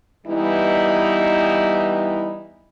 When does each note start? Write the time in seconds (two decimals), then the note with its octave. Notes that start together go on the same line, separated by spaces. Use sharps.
0.27 E3 G3 B3 D#4 E4